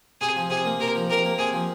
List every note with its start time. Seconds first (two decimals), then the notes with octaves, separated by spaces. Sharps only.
0.21 C3 G#4
0.36 F3
0.50 C3 G#4
0.65 A#3
0.79 C3 A#4
0.95 F3
1.10 C3 A#4
1.25 A#3
1.39 C3 G#4
1.53 F3